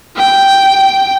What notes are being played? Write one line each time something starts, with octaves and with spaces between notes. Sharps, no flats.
G5